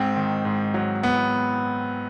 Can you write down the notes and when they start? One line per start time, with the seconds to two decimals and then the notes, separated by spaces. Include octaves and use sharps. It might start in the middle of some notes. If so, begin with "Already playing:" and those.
Already playing: G#2 C4
0.16 D#3
0.45 G#2
0.74 F#3
1.03 B3